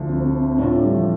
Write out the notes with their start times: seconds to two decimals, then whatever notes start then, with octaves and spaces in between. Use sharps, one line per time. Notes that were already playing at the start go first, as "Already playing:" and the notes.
Already playing: D2 D3 F3
0.09 C4
0.58 A2 A3 D4 F4
0.71 D4
0.84 G3
0.96 F3